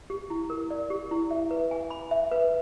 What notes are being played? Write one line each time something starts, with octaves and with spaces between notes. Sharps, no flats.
G4
E4
A#4
D5
G4
E4
E5
B4
G#5
B5
E5
B4